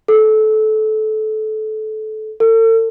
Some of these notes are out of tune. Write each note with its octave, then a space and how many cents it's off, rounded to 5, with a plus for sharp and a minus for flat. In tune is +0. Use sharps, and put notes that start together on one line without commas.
A4 -20
A4 +40